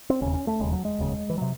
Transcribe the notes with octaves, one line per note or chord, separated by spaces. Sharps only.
C4
E1 D#2 C#3 C#4
C#4
A3
E1 D#2 C#3 G#3
F#3
G#3
E1 D#2 C#3
E3
C3 F#3